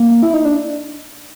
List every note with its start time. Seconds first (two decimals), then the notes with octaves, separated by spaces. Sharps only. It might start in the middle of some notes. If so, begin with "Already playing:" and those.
Already playing: A#3
0.23 E4
0.34 D#4
0.45 D4